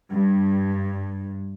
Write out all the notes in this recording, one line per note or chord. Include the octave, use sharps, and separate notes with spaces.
G2